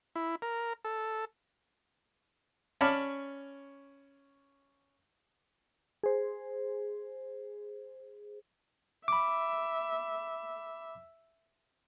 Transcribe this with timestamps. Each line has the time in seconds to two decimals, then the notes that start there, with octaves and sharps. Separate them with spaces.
0.16 E4
0.42 A#4
0.85 A4
2.81 C#4 C#5 D5 A5 B5 F6
6.03 G#4 C5
9.08 E5 B5 D6